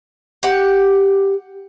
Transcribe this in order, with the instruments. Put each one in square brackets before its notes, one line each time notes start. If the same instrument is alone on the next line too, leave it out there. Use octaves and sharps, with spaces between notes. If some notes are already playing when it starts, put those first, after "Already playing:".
[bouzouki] G4 F#5